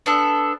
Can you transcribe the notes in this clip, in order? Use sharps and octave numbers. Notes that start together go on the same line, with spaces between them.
B3 D4 A4